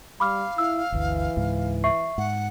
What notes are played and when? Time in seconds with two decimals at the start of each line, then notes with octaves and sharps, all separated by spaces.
0.20 G3 F5 B5 D6 F6
0.58 E4 E6
0.92 G1 D2 E3
1.37 C#2 G#2
1.84 E5 C#6 C7
2.18 G#2 F#5